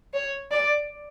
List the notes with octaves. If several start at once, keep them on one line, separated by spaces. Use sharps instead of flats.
C#5
D5